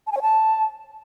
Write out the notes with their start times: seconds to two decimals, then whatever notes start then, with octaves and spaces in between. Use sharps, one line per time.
0.07 A5
0.12 G#5
0.17 C#5
0.22 A5